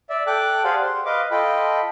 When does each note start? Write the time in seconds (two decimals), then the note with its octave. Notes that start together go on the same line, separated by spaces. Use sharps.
0.10 D5 E5
0.27 A4 G5 D6 F#6
0.64 G4 G#4 C5 D5 F5 F#5
0.82 C5
1.06 B4 D#5 F5 D6
1.31 F4 A4 D#5 G5 B5